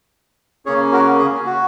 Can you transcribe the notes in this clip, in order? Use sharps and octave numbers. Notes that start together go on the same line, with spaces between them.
C#3 A#3 C#4 G#4 C#5
F#4 A#4
G#4
F#4